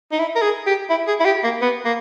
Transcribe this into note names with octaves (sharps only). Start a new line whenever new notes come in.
D#4
E4
A#4
G#4
G4
E4
G#4
E4
G4
A#3
B3
A#3